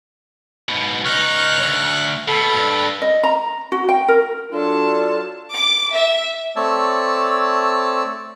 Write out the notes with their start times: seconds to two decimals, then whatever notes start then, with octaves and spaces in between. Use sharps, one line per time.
0.68 G#2 B2
1.05 C#2 D#4 C#6 F6 F#6
1.63 D2
2.28 B2 A4 B5
2.57 G2
3.02 D#5
3.23 A#5
3.72 F#4
3.89 G5
4.08 A#4
4.52 F#3 D4 F4 A4 A5
5.54 D6
5.92 E5
6.56 A3 C4 C#5 D5 A5 E6